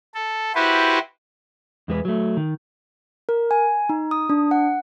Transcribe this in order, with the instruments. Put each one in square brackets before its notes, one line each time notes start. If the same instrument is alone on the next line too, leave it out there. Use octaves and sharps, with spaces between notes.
[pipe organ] A4
E4 F#4 G4 B4 C5
[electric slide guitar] E2 G#3 B4
F#3 A3
D#3
[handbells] A#4
G#5
D#4
D#6
D4
F#5